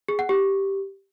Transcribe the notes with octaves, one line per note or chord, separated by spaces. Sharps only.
G#4
F#5
G4